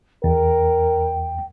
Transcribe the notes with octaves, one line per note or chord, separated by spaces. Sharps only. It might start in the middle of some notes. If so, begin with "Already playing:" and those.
E2 A#4 G5